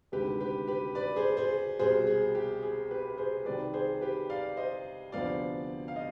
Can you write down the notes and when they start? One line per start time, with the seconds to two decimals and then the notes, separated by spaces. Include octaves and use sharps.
0.12 D2 C3 D#3 G#3 G4 B4
0.40 G4 B4
0.67 G4 B4
0.95 B4 D5
1.16 G#4 C5
1.37 G#4 C5
1.79 C2 B2 G3 C4 G#4 C5
2.07 G#4
2.35 G4
2.63 G#4
2.91 G4 B4
3.18 G#4 C5
3.46 C2 C3 D#3 B4 D5
3.73 G#4 C5
4.01 G4 B4
4.29 D5 F5
4.57 C5 D#5
5.12 D2 C3 F3 B3 D5 F5
5.88 F5
5.96 D#5